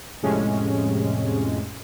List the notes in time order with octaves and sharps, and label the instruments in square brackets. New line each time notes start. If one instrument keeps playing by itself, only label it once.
[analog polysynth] F2 A2 C3 G#3 C#4